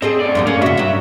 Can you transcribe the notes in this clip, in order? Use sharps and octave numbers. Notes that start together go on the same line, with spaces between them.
C4 G#4 A4 D#5
D2 D5
F#2 F3 G#3
A#3 C#4
C#3 F#4 E5
G2 F#3